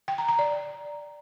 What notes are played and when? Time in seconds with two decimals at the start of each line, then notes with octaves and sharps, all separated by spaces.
0.08 G5
0.18 A#5
0.29 A#5
0.39 D5